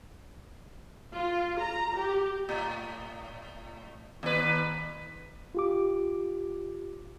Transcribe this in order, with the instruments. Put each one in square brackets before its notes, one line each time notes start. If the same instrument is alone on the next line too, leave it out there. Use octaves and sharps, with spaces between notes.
[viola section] F4
A#5
G4
[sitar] A2
D#2 B4
[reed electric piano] F4 G4 D6